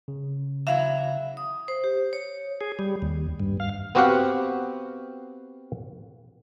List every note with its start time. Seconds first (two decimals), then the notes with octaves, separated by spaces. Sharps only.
0.08 C#3
0.67 E2 F#3 E4 E5 F5
1.37 D#6
1.68 C5
1.84 G4
2.13 C#5
2.61 G#4
2.79 G3
3.02 D#2
3.40 G2
3.60 F5
3.95 B3 C4 F#4 G4 F5 F#5